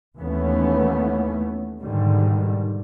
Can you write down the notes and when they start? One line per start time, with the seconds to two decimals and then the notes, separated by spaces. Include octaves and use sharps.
0.19 D#2 E3 A3 B3 C#4
1.82 G#2 B2 D3 D#3 G3